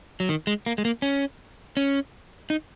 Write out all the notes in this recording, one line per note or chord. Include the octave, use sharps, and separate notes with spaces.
F#3
D#3
G#3
A#3
G#3
A#3
C#4
C#4
D#4